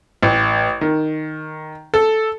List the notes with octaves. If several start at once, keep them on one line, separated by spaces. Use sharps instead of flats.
A1
D#3
A4